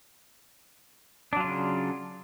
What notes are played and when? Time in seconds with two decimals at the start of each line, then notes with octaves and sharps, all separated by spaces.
1.33 D4
1.36 F#3
1.40 F4
1.44 C#3